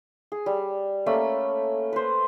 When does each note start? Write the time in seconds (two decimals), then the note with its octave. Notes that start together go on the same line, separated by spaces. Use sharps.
0.32 G#4
0.46 G3
1.06 A3 A#3 C#4 B5
1.93 B4 C5